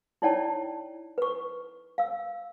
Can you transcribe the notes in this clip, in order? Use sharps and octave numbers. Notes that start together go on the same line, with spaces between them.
D#4 E4 C#5 D5 G5 A5
B4 C#6
F5 E6